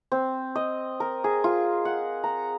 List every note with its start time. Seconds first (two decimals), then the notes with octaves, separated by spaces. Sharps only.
0.12 C4
0.56 D#5
1.00 A#4
1.24 G#4
1.44 F4
1.85 F#5
2.24 A#5